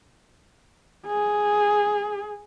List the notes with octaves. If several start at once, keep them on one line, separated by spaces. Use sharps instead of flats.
G#4